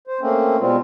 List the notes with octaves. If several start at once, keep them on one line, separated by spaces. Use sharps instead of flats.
C5
A3 A#3 C4 C#4
B2 G3 G#3 C4 F4